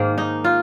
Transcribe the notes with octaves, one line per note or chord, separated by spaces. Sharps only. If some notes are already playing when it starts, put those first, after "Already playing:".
Already playing: G#2 D#3 A#3
D#4
F4